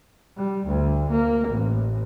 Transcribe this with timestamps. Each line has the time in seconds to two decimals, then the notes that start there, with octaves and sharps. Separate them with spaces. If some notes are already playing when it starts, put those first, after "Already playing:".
0.37 G3
0.68 D2
1.11 A#3
1.49 A1